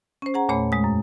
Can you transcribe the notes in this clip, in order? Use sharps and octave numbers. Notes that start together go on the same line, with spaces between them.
C#4 C5
G#4 F#5 A#5
E2 A#2 A3 C#5 B5
G#3 D#6
F#2